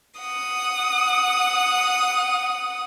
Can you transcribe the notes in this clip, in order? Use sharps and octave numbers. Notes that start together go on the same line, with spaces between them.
F#5 D#6